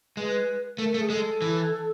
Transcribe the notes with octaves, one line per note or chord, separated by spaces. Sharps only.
G#3 B4
A3 A#4
A3
G#4
G#3 A4
E3